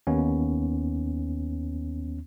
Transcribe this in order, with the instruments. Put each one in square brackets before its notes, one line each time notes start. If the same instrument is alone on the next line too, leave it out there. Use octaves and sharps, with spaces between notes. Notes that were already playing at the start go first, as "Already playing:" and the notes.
[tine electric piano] D#2 B3 C#4